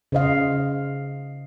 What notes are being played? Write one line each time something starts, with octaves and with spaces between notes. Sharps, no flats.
C#3 C5 D#5 F5